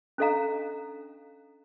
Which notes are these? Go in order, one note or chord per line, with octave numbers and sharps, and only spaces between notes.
C#4 D4 A4 D#5 F5 A#5